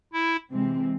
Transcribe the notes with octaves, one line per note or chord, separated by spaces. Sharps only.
E4
C3 E3 G#3 C4